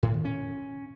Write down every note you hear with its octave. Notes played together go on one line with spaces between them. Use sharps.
A2
D#3
C#4